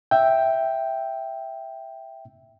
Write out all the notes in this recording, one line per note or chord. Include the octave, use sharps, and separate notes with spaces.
E5 G5